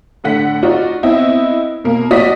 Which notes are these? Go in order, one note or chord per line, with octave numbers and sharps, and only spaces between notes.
A2 D3 F#5 B6
D#4 F4 F#4 D5
B3 C4 E4 D#5
B2 A#3
A#1 F#4 D5 D#5 D#6 B6